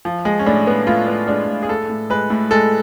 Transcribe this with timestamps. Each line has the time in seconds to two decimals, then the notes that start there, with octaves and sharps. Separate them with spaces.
0.05 F3
0.25 G#3
0.39 C#4
0.46 A2 D4
0.67 B3
0.87 A2 F4
1.08 B3
1.28 G#3 D4
1.48 A2
1.63 G#4
1.69 A2 A4
1.90 A2
2.10 G#3 B4
2.30 A2
2.51 G#3 A4